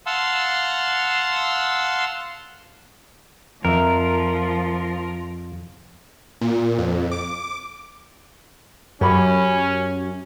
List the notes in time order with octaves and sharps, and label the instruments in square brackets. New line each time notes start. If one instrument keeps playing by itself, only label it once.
[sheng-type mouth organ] F5 F#5 A5 C6 E6
[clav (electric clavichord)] F2 E5 [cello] F3 [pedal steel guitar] A#4
[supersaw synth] A#2
F2
D6
[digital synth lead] F#2 [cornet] C#4 [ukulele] G4 B5